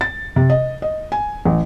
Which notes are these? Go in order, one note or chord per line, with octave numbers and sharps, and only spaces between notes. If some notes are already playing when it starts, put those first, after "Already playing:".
A6
C3
D#5
D#5
G#5
A1